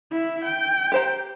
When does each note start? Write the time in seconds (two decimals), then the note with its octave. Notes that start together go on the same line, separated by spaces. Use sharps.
0.11 E4 E5
0.45 G5
0.92 G4 C5 A#5